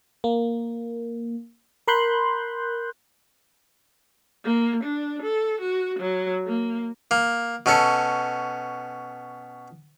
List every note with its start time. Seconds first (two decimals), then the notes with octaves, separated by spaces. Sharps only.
0.24 A#3
1.88 A#4 B5 C6 F#6 G6
4.44 A#3
4.84 D4
5.22 A4
5.61 F#4
5.99 F#3
6.47 A#3
7.11 A#3
7.66 B2 C#4 A4